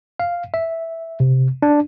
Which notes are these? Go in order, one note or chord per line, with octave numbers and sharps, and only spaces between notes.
F5
E5
C3
D4